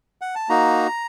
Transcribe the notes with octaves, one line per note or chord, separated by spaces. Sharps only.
F#5
A5
A#3 D#4 F#4 A#5